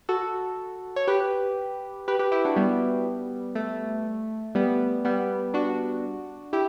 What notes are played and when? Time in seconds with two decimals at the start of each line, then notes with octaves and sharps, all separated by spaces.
0.09 F#4 A4
0.96 C#5
1.08 G4 B4
2.08 G4 B4
2.19 G4 B4
2.32 E4 G4
2.45 D4 F#4
2.56 G3 B3
3.55 A3
4.55 G3 B3
5.05 G3 B3
5.54 D4 F#4
6.53 E4 G4